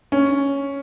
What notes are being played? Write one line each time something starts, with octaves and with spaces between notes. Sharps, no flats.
C#4